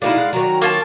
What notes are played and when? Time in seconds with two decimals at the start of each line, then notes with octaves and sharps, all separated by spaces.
0.02 G#3 D#4 E4 F#4 D5 F5
0.17 G#3 D#4 F#5
0.33 D#3 F#3 F#4 A#5
0.61 A#3 F4 A5 C#6